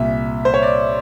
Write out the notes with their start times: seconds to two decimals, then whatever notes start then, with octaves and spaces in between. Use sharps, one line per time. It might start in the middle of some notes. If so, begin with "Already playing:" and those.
Already playing: C2 A#2 E5
0.45 C5
0.54 C#5
0.63 D5